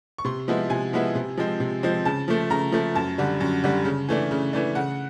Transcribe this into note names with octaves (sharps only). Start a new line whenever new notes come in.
C#6
C3 C6
F3 G#3 B3 E4
C3 G#5
F3 G#3 B3 E4
C3
F3 G#3 C4
C3
F3 G#3 C4
C#3 A5
F3 A3
C#3 A#5
F3 A3
F#2 A5
D3 G3
F#2
D3 G3
C#3
E3 A3 D4
C#3
E3 A3 D4
C#3 F#5